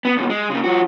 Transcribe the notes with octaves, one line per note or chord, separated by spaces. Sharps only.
B3
D#2 B2
G#3
C#3 A#3
F3 F#4